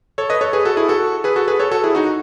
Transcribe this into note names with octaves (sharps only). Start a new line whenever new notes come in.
A4 C#5
B4 D#5
A4 C#5
G#4 B4
F#4 A4
E4 G#4
F#4 A4
G#4 B4
F#4 A4
G#4 B4
A4 C#5
F#4 A4
E4 G#4
D#4 F#4